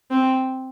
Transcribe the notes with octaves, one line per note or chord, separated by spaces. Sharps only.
C4